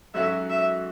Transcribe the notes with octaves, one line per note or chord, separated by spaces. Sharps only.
G#2 F#3 C#4 F#4 A4 E5
E5